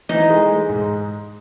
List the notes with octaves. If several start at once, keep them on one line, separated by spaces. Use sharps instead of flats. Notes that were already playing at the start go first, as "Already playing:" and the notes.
E3 D#4
G#3
G#3
G#2